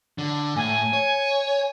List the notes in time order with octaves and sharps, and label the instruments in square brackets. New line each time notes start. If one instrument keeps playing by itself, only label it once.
[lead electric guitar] D3
[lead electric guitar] A2 [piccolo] G#5
[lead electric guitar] C#5